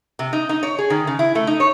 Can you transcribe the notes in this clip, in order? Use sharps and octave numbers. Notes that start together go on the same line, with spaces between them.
C3
D#4
D#4
C#5
G#4
D#3
C#3
E4
A3
D#4
C#5